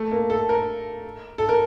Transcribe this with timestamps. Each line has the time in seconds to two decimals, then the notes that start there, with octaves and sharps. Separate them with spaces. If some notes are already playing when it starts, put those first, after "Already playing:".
Already playing: A3
0.12 A#3
0.30 A4
0.49 A#4
1.38 A4
1.49 A#4